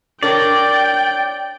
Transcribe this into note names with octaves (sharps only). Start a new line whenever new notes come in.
D4 A#4 C#5 D5 G5